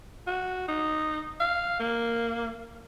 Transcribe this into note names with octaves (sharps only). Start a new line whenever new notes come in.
F#4
D#4
F5
A#3